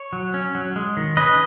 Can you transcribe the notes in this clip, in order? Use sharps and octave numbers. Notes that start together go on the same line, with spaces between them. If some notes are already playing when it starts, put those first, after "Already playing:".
Already playing: C#5
F#3
C#4
F#3
G#3
D#3
C#4 B4 D#5